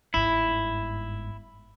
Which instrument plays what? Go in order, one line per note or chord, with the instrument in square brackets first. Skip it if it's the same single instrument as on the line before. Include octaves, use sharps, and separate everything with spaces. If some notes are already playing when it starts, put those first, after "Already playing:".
[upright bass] G1 G#2 [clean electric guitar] E4